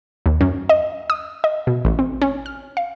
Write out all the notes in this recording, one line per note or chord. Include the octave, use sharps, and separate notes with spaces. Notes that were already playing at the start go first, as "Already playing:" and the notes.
D#2
F#2
D#5
D#6
D#5
B2
A1
C4
C#4
F6
F5